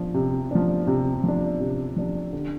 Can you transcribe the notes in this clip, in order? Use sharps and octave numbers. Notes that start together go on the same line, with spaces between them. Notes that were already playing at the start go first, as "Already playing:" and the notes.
Already playing: F3 D4
C3
F3 D4
C3
F3 D4
C3
F3 D4
D3